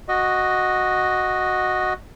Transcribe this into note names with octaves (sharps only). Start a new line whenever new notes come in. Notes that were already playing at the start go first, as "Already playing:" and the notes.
F#4 D#5